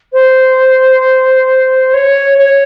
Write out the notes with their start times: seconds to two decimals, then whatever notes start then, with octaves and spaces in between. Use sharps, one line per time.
0.13 C5
1.94 C#5
2.38 C#5